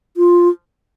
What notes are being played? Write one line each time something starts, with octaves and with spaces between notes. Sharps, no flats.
F4